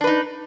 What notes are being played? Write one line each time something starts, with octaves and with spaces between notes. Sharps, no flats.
D4 D#4 B4